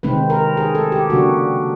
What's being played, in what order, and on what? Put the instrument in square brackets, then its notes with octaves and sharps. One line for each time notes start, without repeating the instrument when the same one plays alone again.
[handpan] C3 D#3 G#3 C4 B4
A#4
G#4
A4
G4
C#3 F#3 A#3 D4 F#4